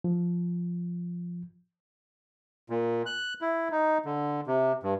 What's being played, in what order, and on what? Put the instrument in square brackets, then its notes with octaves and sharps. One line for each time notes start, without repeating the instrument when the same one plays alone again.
[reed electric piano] F3
[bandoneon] A#2
F#6
E4
D#4
D3
C3
G2